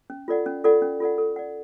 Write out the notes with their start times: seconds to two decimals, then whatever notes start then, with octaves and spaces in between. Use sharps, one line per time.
0.10 C#4
0.28 F4 A4 D5 F#5
0.46 C#4
0.64 F4 A4 D5 F#5
0.82 C#4
1.00 F4 A4 D5 F#5
1.18 A4
1.36 D5 F#5